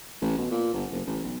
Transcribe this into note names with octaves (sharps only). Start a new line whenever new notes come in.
A1
B2
A#2
G1
F#1
A1
B1